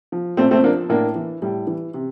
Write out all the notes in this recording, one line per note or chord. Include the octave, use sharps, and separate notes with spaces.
F3
A#2 A3 C4
A3 C4
F3 A#3 D4
A2 A#3 D4
E3
A2 G3
E3
C3